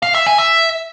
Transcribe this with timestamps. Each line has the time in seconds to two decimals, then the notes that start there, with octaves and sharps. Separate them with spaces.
0.03 F5
0.15 E5
0.26 G#5
0.38 E5